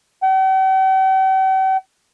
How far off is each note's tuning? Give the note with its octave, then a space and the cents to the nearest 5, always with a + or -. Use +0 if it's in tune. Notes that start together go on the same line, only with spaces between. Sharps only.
G5 -45